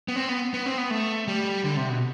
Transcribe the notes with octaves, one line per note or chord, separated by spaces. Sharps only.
B3
C4
B3
B3
C4
B3
A3
G3
D3
C3
B2